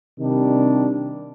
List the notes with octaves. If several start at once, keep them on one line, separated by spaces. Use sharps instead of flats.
C3 D#3 G3 D4